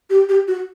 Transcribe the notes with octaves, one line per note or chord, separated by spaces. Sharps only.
G4
G4
F#4